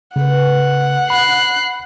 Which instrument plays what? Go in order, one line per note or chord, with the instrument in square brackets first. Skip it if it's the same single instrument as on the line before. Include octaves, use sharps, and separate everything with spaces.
[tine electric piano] C#3 [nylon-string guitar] A3 B4 [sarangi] F#5
[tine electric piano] B5 [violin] F#6 C7